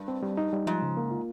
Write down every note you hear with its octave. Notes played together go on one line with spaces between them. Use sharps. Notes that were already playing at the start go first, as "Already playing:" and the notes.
Already playing: G2
C4
G3
D#4
G3
G#2 F3
C#3
A#3
F4